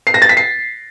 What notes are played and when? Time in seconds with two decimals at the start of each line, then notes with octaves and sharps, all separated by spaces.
0.07 C7
0.14 A#6
0.22 A6
0.29 B6
0.37 C7